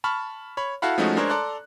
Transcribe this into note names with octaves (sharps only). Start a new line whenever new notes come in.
A5 B5 C#6 F6
C#5 B5
E4 F#4 A4 F5 F#5 B5
F3 G#3 A3 C#4 D#4 F#4
G#3 D4 A#4 C5 C#5
A4 D5 A#5 C6 F#6